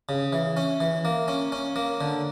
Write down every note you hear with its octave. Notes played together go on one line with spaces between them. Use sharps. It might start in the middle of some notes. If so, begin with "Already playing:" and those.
C#3
E3
C#4
E3
A#3
C#4
C#4
A#3
D3